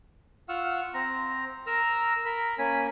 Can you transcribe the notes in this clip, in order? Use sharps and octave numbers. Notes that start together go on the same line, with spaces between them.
F4 F#5 C#6 E6 F6
C4 A#5
A#4 A#5 E6 F6
A#4 B5
A#3 C#4 G#5 B5